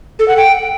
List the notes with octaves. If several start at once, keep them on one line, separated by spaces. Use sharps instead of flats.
A4
F#5
G5